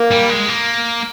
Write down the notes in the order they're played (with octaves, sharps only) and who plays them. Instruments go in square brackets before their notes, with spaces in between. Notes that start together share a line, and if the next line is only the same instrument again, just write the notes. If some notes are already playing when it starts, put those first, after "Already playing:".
Already playing: [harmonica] A#3
[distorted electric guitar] G3
G#3
A#3